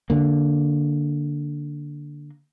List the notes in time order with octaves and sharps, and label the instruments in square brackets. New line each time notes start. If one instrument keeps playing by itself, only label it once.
[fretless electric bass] D3 A#3